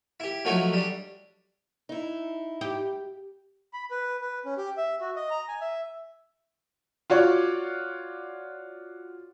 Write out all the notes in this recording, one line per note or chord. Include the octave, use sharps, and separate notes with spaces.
E4 G4
F3 F#3 A3 D#4 F#4 C#5
G3 D4
D#4 E4
G4
B5
B4
B4
C#4
G4
E5
F#4
D#5
A#5
G#5
E5
F4 F#4 C#5 D5